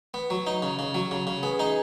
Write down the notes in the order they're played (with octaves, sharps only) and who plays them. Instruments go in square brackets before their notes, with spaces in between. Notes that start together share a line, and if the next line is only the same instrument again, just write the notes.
[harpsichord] B3
F#3
D#4
C#3
C#3
F#3
C#3
C#3
[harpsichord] B3 [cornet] G#4
[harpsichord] D#4